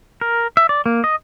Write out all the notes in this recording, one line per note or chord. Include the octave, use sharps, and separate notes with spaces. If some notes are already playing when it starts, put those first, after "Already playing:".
A#4
E5
D5
A#3
D#5